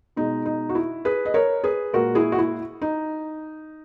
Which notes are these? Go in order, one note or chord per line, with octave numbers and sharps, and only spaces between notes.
B2 G#3 D#4
D#4
F#4
E4
G#4 B4
D#5
A#4 C#5
G#4 B4
A#2 G#3 F#4 A#4
E4 G#4
F#4
E4
D#4